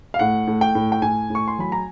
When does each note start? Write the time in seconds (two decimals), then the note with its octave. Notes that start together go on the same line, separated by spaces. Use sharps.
0.14 F5
0.19 A2 F#5
0.47 A2
0.61 G5
0.75 A2
0.92 G5
1.02 A2 G#5
1.30 A2
1.35 C#6
1.48 C6
1.58 F#3 B5
1.72 A#5